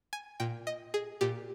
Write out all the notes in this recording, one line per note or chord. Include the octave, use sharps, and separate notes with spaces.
G#5
A#2 G5
D#5
G#4
A#2 G4